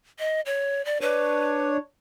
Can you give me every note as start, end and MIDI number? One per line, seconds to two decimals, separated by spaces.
0.19 0.41 75
0.46 0.84 73
0.85 0.98 74
1.01 1.77 62
1.01 1.69 71
1.01 1.77 73